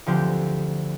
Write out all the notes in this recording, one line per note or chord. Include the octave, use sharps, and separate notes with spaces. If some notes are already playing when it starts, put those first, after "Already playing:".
D2 D3 F3 C4 G4